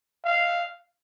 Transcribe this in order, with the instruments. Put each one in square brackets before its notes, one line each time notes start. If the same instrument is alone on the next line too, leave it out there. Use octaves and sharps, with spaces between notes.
[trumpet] F5